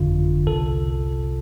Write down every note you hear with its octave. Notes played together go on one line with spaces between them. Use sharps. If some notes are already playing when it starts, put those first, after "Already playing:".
Already playing: G1 F2 D3 F4
C2 C3 A4